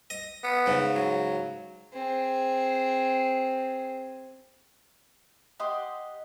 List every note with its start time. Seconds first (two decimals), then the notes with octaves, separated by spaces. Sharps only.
0.10 D#5
0.43 B3
0.66 G#2 C#3
0.95 F#3
1.93 C4 G#4
5.60 G4 D#5 F#5 C6